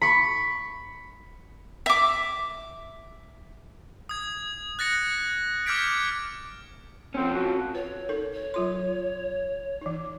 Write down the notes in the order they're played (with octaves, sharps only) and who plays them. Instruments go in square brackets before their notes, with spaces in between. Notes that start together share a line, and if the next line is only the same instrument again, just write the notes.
[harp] B5 C#6
[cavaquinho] E5 D6
[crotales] D#6 G#6
F#6 A6 A#6 C#7
D6 F6 G6 G#6 B6 D7
[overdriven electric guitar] F3 C#4 [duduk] C4
[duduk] F#4
[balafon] B4 [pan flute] C#5
[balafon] D#4 A4 A#4
[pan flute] C#5
[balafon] F#3 F4 C6
E3 D#4